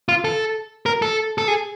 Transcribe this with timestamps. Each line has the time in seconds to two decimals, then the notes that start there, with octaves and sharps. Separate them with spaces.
0.09 F4
0.25 A4
0.86 A#4
1.02 A4
1.38 A4
1.48 G#4